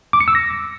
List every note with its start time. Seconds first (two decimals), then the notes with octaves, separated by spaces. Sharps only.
0.13 D6
0.20 C#7
0.28 E6
0.35 A#6